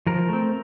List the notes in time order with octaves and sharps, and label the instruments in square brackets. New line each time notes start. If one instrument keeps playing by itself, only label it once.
[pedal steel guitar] F3 A#4
A3 C4